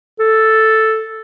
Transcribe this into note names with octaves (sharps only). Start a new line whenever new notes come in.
A4